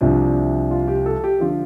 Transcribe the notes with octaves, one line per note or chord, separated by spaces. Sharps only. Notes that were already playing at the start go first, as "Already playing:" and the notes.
C2 C3 F3 D4
F4
G4
A4
G4
D3 F3 F4